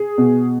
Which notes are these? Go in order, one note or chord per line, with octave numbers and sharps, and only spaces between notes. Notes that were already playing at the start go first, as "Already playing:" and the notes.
Already playing: G#4
B2